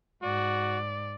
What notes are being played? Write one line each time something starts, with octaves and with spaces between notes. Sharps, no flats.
G#2 F#4 D5